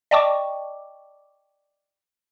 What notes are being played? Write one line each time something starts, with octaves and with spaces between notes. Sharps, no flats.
D5 D#5 G5 A5 C#6 D6